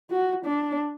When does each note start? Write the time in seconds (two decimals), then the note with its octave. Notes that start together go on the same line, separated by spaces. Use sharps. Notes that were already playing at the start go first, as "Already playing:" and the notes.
0.11 F#4
0.45 D4